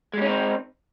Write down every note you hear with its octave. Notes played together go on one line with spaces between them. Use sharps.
G3 G#3 C4 C#4 D#4